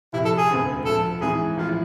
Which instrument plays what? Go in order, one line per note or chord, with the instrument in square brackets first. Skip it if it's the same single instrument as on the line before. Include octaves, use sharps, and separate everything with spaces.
[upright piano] F1 F2 C3 [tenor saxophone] E4
[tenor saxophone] A4
G#4
[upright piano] E1 D2 D3 G#3 C4
[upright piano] D2 D3 F3 [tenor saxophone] A4
[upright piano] G#2 E3 G#3 C4 E4 [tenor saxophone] G#4
[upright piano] A1 A2 F3 [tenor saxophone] F4